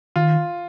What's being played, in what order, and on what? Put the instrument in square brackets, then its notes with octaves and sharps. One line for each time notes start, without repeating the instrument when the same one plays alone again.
[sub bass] D#3 [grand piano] F4